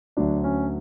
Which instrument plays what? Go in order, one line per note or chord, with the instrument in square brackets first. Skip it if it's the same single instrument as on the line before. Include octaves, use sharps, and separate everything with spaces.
[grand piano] D2 D3 F#3 D4
C#4